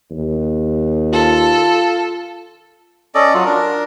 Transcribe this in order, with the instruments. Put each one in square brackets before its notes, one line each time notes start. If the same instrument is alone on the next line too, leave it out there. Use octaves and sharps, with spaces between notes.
[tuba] D#2
[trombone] F4 [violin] A4
[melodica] C#4 A4 D5 D#5
F#3 F4
D4 A#4